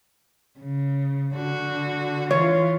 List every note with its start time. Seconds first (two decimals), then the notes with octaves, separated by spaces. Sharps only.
0.60 C#3
1.35 D3 F#4
2.31 E3 F4 C#5